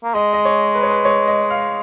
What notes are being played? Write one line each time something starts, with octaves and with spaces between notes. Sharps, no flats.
A#3
G#3 D#5
D#5
C#5
B4
C#5
B4
C#5
D#5
F5